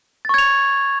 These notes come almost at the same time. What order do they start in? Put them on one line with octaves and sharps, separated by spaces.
A6 C#6 G#6 F7